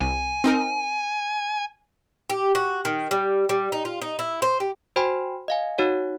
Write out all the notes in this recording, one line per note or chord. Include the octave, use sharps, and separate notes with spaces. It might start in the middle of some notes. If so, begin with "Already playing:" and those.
C2 G#5
C4 D#4 A#4
G4
F#4
D#3
G3
G3
D#4
F4
D#4
E4
C5
G4
F#4 C5 G5 G#5 B5 C6
D#5 F5 G#5
D#4 F#4 C#5 F#5